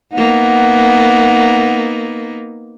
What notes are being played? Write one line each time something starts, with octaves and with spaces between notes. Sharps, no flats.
A#3 B3 D#4 F#5